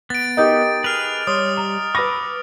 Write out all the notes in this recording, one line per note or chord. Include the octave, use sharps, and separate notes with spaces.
B3 A6 D7
D#4 G4 A#4 D#5 D#6 G6
G#4 B4 F6 F7
G3 C#5 C6 D#6
A#5
B4 B5 C#6 D6 E6 A#6 D#7